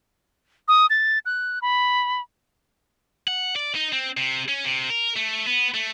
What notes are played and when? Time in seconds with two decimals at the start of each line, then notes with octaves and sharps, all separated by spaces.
0.68 D#6
0.90 A6
1.26 F#6
1.62 B5
3.28 F#5
3.56 D5
3.75 D#4
3.93 C4
4.17 C3
4.49 C#4
4.65 C3
4.90 A#4
5.16 A3
5.47 B3
5.74 A3